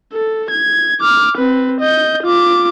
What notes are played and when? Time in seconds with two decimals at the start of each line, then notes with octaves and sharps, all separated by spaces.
0.13 A4
0.50 G#6
1.00 D6 F6
1.37 C4 B4
1.81 D#5 G6
2.24 F4 D6